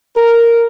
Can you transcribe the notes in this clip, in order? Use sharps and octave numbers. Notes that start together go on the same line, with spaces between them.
A#4